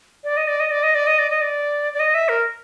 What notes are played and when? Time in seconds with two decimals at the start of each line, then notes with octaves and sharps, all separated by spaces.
0.24 D5
0.37 D#5
0.48 D5
0.60 D#5
0.71 D5
0.83 D#5
0.95 D5
1.07 D#5
1.19 D5
1.30 D#5
1.42 D5
1.94 D5
2.00 D#5
2.15 E5
2.29 A#4